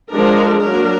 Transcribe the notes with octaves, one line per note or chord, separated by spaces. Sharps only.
F3 G#3 D4 A#4
F#3 A#3 D4 A#4